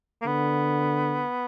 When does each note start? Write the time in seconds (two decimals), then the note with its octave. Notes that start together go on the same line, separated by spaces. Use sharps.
0.22 A#3
0.26 D3 B3